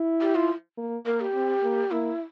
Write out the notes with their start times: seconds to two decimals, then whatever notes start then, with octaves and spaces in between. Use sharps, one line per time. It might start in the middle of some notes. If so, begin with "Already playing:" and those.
Already playing: E4
0.21 G4
0.35 F4
0.78 A#3
1.06 A#3 A#4
1.21 G4
1.34 C4
1.63 A#3
1.91 A#3 E4